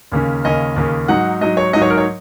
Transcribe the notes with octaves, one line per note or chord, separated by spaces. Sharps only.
D#2 C#3 A#3 C#4
D#2 C#3 A#3 C#4 D#5
D#2 C#3 A#3 C#4
G#2 F#3 D#4 F#5
G#2 F#3 D#4 D#5
C#5
G#2 F#3 D#4 D#5
C#5
A#4
C#5